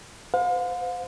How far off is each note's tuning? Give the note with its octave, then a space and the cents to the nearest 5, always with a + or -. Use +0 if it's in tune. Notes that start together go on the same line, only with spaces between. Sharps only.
C5 -40 F5 +40